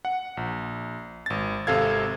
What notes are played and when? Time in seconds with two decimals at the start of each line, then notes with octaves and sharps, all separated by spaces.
0.05 F#5
0.37 A#1
1.26 G#1 A6
1.67 G#1 C3 A4 F5 G#6